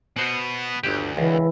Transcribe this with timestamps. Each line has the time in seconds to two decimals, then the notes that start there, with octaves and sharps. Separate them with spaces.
0.16 B2 B3 F#4 C5 F#5
0.84 G1 D2 G4
1.17 C#2 E3